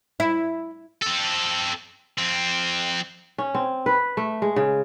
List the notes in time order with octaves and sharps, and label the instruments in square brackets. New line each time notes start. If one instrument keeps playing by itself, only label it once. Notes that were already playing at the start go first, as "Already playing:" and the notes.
[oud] E4
[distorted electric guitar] C4 A4
F2 C4
[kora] C#4
C4
B4
A3
G#3
C#3